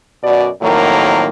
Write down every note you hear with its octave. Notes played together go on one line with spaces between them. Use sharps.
F#2 B2 F#4 D5
F2 A2 D#3 F#3 A#3